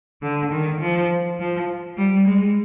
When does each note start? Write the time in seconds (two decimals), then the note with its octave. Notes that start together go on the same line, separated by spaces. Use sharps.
0.22 D3
0.51 D#3
0.80 F3
1.39 F3
1.97 G3
2.27 G#3